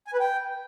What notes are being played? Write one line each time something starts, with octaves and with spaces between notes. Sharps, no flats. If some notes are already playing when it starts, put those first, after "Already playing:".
G#5
B4
G5